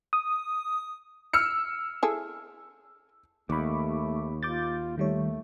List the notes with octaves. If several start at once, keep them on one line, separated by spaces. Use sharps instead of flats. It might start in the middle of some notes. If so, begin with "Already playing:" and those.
D#6
E6 F6 C#7
E4 G#4 A4
D#2 A3 B5 C#6 D6
F4 D6 G6 A6
D#3 G3 A3 C#5